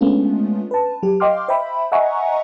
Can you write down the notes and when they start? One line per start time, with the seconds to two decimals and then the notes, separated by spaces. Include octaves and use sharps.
0.01 G#3 A3 B3 C#4 D4 F4
0.71 B4 A5
1.03 F#3 G4
1.20 D#5 F5 G5 C6 D6 F6
1.48 C5 E5 G5 B5
1.92 D#5 E5 F#5 G#5 A#5 C#6